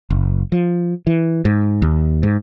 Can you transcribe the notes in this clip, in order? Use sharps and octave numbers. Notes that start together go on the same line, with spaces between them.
F#1
F3
E3
G#2
D#2
G#2